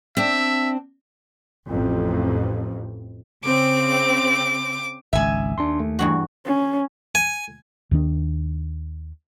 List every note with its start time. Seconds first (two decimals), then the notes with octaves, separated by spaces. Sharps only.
0.17 C4 D4 E5
1.69 A1 F2
3.44 C#3 C4 D6
5.13 G#1 C#2 E5 G#5
5.58 D#2 D4 C6
5.80 A3
5.99 E2 G2 F#4
6.46 C#4
7.15 G#5
7.91 D#2 D#3 D4